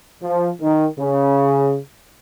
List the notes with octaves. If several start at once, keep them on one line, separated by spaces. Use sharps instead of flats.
F3
D#3
C#3